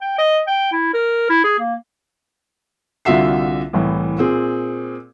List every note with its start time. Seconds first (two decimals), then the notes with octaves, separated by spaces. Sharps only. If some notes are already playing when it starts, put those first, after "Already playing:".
0.01 G5
0.18 D#5
0.48 G5
0.72 E4
0.94 A#4
1.29 E4
1.44 G#4
1.60 A#3
3.05 C2 D3 F4 F#4 E5 C7
3.73 C2 A2 E3
4.18 A#2 C4 G#4